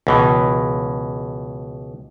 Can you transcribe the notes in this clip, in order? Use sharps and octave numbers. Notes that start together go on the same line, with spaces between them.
C#2 B2 E3